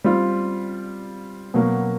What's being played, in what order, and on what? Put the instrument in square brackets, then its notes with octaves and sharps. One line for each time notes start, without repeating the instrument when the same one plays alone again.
[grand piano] G3 C4 F4
B2 F#3 A#3